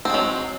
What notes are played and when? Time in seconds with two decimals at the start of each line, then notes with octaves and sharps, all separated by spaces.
0.05 C4
0.10 G#3
0.14 F#3